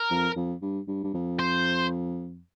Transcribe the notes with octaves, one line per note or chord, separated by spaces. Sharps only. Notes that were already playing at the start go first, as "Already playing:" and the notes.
Already playing: A#4
F2
F2
G2
G2
G2
F2
C5